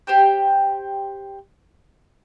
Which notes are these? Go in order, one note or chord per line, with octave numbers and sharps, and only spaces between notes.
G4 C5 G5